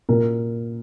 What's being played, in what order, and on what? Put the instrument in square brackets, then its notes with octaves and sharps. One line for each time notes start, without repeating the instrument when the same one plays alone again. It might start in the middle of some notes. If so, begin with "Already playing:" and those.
[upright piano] A#2 A#4